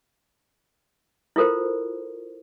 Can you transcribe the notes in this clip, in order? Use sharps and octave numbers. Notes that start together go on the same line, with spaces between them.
E4 F4 A4 A#4 C5